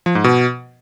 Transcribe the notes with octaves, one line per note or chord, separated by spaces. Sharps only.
F3
G#2
B2